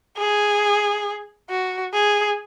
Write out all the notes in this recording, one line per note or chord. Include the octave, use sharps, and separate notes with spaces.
G#4
F#4
G#4